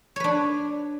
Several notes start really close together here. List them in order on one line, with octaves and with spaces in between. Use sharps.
C#5 B4 D4